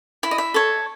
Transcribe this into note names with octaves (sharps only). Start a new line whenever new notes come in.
E4 E5
D#5
E5
A4 C#5